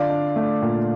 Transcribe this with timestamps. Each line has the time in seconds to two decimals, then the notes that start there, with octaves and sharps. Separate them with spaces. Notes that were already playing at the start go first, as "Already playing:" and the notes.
Already playing: D3 F4 D5 F5
0.10 D4
0.36 A3
0.62 A#2